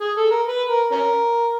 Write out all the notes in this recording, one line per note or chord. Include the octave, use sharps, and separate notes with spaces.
G#4
A4
A#4
B4
A#4
C#4 A#4